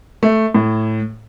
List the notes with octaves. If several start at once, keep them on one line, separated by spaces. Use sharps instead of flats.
A3
A2